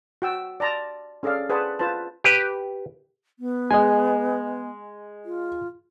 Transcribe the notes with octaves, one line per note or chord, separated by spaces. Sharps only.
F#4 G5 E6
D5 A5 A#5 C6
C#4 G#4 A4 D5 F5
G#4 B4 C5 D5 F#5 A5
F4 B4 C5 A5
G4 B4
B3
G#3 D#5 G#5
F4